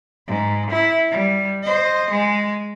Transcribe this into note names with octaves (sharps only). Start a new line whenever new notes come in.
G#2
E4
G3
C5 D#5
G#3